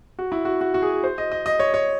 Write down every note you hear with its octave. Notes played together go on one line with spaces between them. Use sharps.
F#4
E4
F#4
F#4
F#4
G#4
C5
D#5
D#5
D#5
C#5
C#5